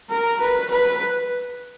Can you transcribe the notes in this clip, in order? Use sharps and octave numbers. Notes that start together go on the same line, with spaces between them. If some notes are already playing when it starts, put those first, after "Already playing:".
A#4
B4
B4